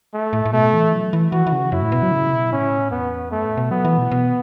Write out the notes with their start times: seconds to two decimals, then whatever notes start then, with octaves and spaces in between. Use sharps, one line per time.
0.14 A3
0.33 A2
0.46 A2
0.53 B2 A3
0.74 E3
0.93 F#3
1.13 E3
1.32 E3 F#4
1.47 E3
1.52 C#3
1.72 F#2 E4
1.82 A2
1.92 B2
2.03 F#3
2.12 C#3
2.32 B2
2.52 A2 C#4
2.91 E2 B3
3.31 F#2 A3
3.45 A2
3.58 B2
3.71 F#3 B3
3.85 E3
3.98 B2
4.12 B2